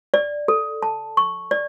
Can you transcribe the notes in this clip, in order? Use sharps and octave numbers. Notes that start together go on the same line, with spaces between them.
D5
A4
A5
C#6
D5